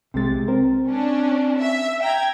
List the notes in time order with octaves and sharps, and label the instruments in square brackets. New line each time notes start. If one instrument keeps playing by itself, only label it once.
[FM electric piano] B1 A6 [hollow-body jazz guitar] C3 G#3
[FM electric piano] C4 [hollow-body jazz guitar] A#4
[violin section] C#4 D4
E5
G5 A#5 G#6